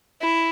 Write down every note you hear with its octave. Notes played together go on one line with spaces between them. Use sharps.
E4